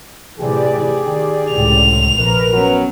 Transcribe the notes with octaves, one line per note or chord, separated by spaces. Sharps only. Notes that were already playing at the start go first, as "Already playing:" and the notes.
A2 C3 E3 G4 G#4 D5
D#3
C#2 A2 C3 F7
A#1 F2 A#4 B4
F#3 B3 C#4